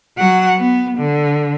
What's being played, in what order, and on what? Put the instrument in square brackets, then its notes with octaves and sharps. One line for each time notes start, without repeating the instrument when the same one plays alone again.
[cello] F#3 F#5
B3
D3